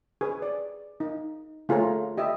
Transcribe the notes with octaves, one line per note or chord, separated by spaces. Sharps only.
G#4 B4
D5
D#4
A3 F4 G#4 A4 C#5 A#5
G4 D#5 E5